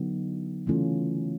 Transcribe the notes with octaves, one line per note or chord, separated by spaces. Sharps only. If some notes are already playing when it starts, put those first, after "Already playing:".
Already playing: D3 F#3 B3 D#4
C#3 E3 A3 C#4 F4